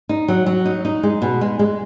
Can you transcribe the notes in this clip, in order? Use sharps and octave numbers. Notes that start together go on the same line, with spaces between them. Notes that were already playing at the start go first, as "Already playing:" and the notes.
D#4
F#3
F#3
D#4
D#4
G#3
B2
G#3
G#3